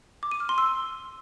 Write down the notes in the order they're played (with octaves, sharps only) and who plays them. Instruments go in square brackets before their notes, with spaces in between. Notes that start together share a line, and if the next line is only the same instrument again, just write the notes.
[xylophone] D6
D#7
F6
C6
E6